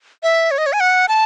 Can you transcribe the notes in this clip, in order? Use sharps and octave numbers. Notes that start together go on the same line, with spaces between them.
E5
C#5
D#5
C#5
G#5
F#5
A5